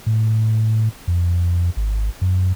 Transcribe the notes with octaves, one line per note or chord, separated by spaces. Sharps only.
A2
F2
G#1
F#2